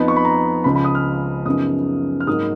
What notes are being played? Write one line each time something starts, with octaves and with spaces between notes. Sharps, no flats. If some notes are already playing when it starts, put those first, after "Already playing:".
Already playing: F2 F3 B3 D#4 B5
C#6
B5
A#5
C#2 C#3 F3 B5
B5
D#6
F6
F#2 C#3 F3 B3 D#4 D#6
F6
G#2 F#3 A#3 D#4 D#6